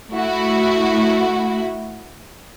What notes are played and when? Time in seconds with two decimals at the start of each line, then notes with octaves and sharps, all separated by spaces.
0.13 A3 E4 F#4